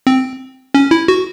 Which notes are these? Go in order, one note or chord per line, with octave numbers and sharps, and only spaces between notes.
C4
C#4
E4
F#4